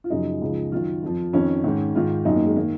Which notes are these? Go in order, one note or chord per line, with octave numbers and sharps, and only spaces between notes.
F4
F#2 C#3 F3 D#4
C#2 C#3 F3
F#2 D#3 F4
F2 F3
F2 D#3 C#4
G#2 D#3
G#2 D#3 F4
F#2 D#3 D#4
A#3
G#3
D#3 A#3